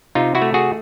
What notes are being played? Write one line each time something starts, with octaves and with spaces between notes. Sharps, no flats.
C3 D#4 F4
E4 F#4
A3
F#4 G#4